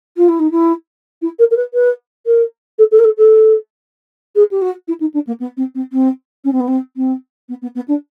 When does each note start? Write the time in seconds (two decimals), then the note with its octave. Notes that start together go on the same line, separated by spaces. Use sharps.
0.17 F4
0.28 E4
0.39 D#4
0.51 E4
1.22 E4
1.39 A#4
1.51 A#4
1.56 B4
1.74 B4
2.26 A#4
2.78 A4
2.91 A4
2.99 A#4
3.04 A4
3.17 A4
4.35 G#4
4.51 G4
4.62 F#4
4.88 E4
5.00 D#4
5.14 D4
5.27 A#3
5.40 B3
5.57 C4
5.75 C4
5.93 C4
6.44 C#4
6.52 C4
6.60 B3
6.68 C4
6.96 C4
7.49 B3
7.62 B3
7.75 B3
7.88 D4